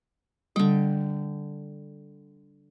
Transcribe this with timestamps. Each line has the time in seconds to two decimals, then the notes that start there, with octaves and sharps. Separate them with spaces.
0.56 D3 G3 G5